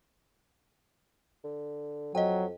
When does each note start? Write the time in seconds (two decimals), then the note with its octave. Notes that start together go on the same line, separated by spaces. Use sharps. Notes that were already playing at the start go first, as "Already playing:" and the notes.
1.44 D3
2.15 F2 F#3 D#5 G5